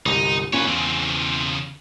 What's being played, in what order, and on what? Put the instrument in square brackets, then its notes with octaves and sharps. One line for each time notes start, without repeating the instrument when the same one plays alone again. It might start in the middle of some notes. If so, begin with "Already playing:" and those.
[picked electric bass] G1 C2 [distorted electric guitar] D#4
[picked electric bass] F#1 A#2 C#4 [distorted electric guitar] B4 C#5
[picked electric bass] E2 [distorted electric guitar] C#3 C4